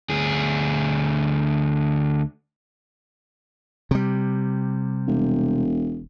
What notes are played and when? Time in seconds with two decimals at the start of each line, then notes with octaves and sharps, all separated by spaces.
0.10 D2 G#4
3.91 C3 G3
5.07 E1